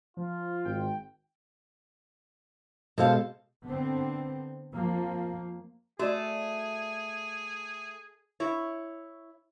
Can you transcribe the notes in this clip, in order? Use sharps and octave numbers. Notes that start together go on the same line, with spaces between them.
F3 F4
G#1 G5
B2 G#3 A4 C5 F5
D3 B3 C4
F2 F3 A#3
A3 F#4 G#4 D5
E4 C#5